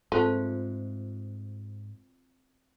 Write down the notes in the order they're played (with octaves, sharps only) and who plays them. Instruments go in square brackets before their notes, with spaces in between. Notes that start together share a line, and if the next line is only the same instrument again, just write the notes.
[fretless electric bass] G#2 [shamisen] A3 [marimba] C4 A5 [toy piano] F4 C5 F5